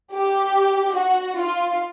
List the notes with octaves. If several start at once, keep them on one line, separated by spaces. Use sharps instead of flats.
G4
F#4
F4